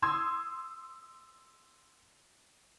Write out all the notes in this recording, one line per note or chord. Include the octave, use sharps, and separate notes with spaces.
C6 D#6 E6 G#6